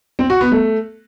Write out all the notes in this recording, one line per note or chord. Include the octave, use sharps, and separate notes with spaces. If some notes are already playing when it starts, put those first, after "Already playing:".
C4
F#4
B3
A3